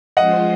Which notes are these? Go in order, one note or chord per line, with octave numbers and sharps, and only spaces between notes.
F3 G#3 C#4 F4 C5 D#5 F#5